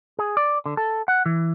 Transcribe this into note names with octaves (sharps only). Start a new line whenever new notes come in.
G#4
D5
D3
A4
F#5
E3